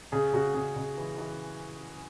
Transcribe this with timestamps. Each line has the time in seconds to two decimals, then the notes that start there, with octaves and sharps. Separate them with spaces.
0.12 C#3 G#4
0.33 C#3 F#4
0.54 C#3 G#4
0.76 C#3
0.97 E3
1.18 E3